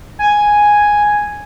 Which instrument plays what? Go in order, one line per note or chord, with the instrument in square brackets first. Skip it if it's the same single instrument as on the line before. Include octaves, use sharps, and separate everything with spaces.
[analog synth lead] G#5